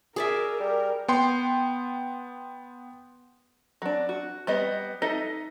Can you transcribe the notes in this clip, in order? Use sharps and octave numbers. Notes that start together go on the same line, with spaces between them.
G#4 A#4 D5 E5
G3 A#4
B3 G5 C6
F#3 D4
F#4
G3 B3 D#5
D#4 A4 D#5 E5